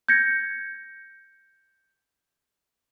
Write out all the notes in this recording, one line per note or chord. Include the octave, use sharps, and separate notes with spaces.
G6 G#6 A#6 C#7